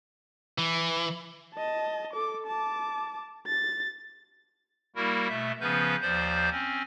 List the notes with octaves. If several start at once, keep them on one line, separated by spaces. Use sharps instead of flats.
E3
D#5 A5
A4 D6
A5 D6
A6
G3 A#3 E4 F#4 A#4
B2 A3 E5
C#3 F3 B3 C#4 B4 G6
D#2 F3 C5 D5 G6
C4 C#4